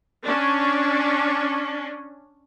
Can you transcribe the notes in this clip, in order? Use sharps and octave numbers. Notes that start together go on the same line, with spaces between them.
C#4 D4